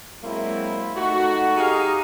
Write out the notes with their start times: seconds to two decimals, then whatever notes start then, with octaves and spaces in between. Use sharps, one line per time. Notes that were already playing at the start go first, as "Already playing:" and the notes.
0.23 F#3 G#3 A#3 C4 E4
0.97 A3 D#4 F#4
1.57 D#4 G4 G#4 F5 A#5